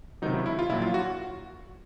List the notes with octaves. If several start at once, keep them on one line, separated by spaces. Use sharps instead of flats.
C#2 C3 D#3 F#3 D#4
E4
E4
F4
A#1 A#2 F#3 E4
F4
F#4